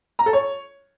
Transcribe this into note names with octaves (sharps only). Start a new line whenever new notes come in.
A#5
A4
C#5